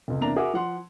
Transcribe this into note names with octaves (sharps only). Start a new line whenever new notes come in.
F1 C#2
E2 C3 A#3 D4 A#5 F7
F#4 G#4 A#4 E5 F#5 D6
F3 F#5 C6